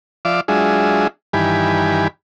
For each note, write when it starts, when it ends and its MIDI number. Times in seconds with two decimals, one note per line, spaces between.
0.25 0.41 53
0.25 0.41 74
0.25 0.41 76
0.25 0.41 77
0.25 0.41 86
0.48 1.07 54
0.48 1.07 56
0.48 1.07 62
0.48 1.07 65
0.48 1.07 68
0.48 1.07 76
1.33 2.08 43
1.33 2.08 51
1.33 2.08 52
1.33 2.08 67
1.33 2.08 80
1.33 2.08 83